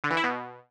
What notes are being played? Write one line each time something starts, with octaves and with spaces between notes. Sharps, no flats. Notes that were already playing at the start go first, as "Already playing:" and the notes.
D3
E3
E4
B2